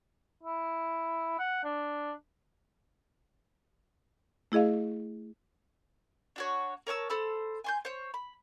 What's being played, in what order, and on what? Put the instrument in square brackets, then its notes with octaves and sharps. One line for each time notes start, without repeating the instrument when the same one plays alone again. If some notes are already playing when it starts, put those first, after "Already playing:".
[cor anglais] E4
F#5
D4
[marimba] A3 E4 G#4 D#5 F5
[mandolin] D4 F#4 C#5
A#4 C#5 A5 E6
A4 C5 B5 E6
G#5 C6 G6
C5 C#5
B5